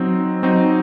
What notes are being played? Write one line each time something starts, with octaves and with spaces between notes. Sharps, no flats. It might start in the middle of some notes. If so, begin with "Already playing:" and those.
Already playing: F#3 C4 D#4
F#3 C4 D#4